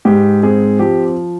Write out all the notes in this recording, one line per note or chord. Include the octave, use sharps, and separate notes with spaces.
G#2 G4
C4 G#4
F3 G4